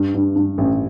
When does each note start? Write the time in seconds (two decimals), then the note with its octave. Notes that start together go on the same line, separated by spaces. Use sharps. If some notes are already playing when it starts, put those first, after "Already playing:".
Already playing: G2
0.14 G2
0.35 G2
0.58 A1